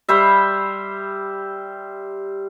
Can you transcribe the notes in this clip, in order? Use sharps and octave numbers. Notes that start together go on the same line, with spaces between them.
G3 C5 E5